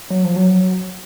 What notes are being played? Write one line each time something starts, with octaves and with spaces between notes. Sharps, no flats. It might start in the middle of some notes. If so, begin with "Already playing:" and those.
F#3
F3
F#3